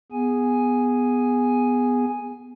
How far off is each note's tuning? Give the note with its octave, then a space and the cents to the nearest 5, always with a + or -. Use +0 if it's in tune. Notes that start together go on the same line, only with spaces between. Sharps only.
B3 +5 G#4 -10 G#5 +0